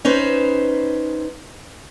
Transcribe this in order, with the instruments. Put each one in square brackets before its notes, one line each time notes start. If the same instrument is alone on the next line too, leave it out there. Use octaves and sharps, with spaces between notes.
[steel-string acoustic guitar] C#4 D#4 B4 C5